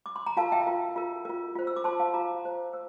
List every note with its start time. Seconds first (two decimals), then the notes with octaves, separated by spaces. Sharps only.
0.06 D6
0.16 C6
0.26 A#5
0.37 F4 A#4 F5 A5
0.52 E5 G5
0.67 F4 A#4
0.96 F4 A#4
1.25 F4 A#4
1.55 F4 C5
1.67 E6
1.76 D6
1.84 F4 C5 A5 C6
2.00 F5 A5
2.14 F4 C5 A#5 D6
2.44 F4 C5
2.73 C5 E6